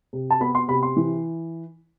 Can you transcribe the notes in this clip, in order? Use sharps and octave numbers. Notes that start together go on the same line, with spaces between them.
C3
A5
B3 B5
C6
C3 B5
C6
E3